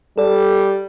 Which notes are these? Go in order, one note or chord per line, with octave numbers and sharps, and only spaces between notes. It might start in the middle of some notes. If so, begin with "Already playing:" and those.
G3 A4 D5